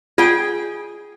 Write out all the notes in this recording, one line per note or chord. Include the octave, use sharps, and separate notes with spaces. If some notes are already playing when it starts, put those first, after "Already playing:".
F4 G#4 G5